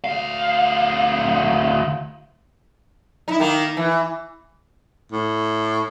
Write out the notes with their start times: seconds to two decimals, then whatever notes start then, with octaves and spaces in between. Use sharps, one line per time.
0.04 D2 F5
3.28 D#4 E4
3.40 D#3 A#3
3.77 E3
5.12 A2